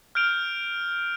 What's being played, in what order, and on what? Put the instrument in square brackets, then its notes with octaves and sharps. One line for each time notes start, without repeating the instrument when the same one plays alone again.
[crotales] F6 G6 D7 F7 G7